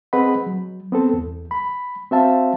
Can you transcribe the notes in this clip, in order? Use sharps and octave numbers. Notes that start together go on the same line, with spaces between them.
C4 G#4 B4 D#5 F#5 B5
F#3
B3 C4 A4
E2
B5
C4 F#4 C5 E5 F5 A5